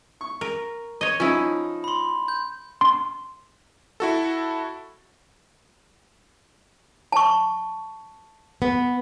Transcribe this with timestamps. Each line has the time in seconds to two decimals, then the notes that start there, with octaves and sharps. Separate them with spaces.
0.21 C#6
0.41 A#4
1.01 C#5 D#5
1.20 F3 C#4 D#4 E4
1.84 B5 C6
2.28 G6
2.81 C6
4.00 E4 F#4 A4
7.12 A5 C#6
8.62 B3